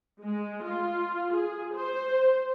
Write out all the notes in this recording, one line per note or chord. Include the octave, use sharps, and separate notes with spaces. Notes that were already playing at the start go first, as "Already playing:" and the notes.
G#3
F4
G#4
C5